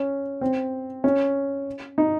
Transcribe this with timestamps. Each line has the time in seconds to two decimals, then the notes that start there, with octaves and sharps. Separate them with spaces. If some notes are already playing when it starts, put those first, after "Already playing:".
Already playing: C#4
0.41 C4
1.04 C#4
1.98 D#4